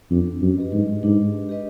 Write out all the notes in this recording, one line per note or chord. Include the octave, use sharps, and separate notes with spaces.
F2 D4
F#2
G4 B4 D#5
G#2
G#2 D4
G4 B4 D#5